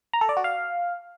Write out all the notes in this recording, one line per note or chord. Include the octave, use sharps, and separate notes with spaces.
A#5
A4
D5
F#4
F5